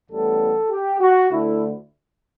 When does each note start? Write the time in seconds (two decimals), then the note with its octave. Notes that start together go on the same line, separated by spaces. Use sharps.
0.11 A1 A2 G3 B3 A4
0.71 G4
1.01 F#4
1.31 D2 D3 A3 E4